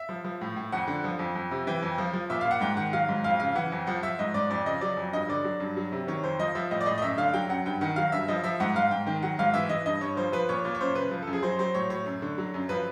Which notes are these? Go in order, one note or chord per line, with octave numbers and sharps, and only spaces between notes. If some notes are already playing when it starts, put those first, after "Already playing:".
Already playing: E5
F3
F3
A2
A2
F2 F#5
D3
F3
F2
F2
C3
E3 G5
F2
F3
F3
A#2 E5
A#2 F5
F#5
G#2 G5
D#3 F#5
F#3 F5
G#2
F2 F5
C#3 F5
E3 F#5
F2
F3 F#5
F3 E5
G#2 D#5
G#2 D5
F2 D5
C#3 D#5
F#3 D5
F2
G2 D#5
D3 D5
F#3
G2
F#3
C3
D#3 C#5
F2 C5
F3 D#5
F3 E5
A2 D#5
D5
A2 D#5
D#5
F#2 E5
D3 F5
F#3 G5
F#2 F#5
G2 G5
D#3 F#5
F#3 F5
G2 E5
F3 D#5
F3 E5
G#2 F#5
G#2 F5
G#2 G5
D#3 G5
F#3 F#5
G#2 F5
E3 E5
E3 D#5
G2 D#5
G2 C#5
F3 C5
F3 B4
A#2 C#5
A#2
C#5
F#2 C5
C#3 B4
F3
F#2 A4
G#4
F#3 C5
F#3 C5
A2 C#5
A2 C#5
F#2
D3
F#3
F#2
F3 B4